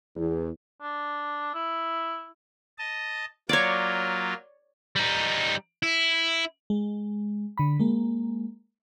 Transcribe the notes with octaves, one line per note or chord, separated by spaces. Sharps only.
E2
D4
E4
D#5 A5
F#3 A#3 F4 C#5 D5
G3 D#4
E4
G#3
D3 B5
G#3 A#3